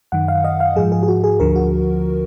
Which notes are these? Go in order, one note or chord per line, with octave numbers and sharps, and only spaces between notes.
F#2 D#3 F#5
F5
D#5
F5
G#2 F3 G#4
G#4
G#4
F#4
G#4
D2 D3 F3 A#4
F#4